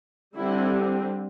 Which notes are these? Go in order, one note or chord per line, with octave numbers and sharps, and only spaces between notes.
D3 G3 C4 E4